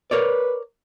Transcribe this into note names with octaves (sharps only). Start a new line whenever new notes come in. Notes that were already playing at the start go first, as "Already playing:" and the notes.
A#4 B4 C#5 D5